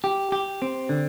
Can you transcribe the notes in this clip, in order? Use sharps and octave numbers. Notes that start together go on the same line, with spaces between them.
G4
G4
C4
D3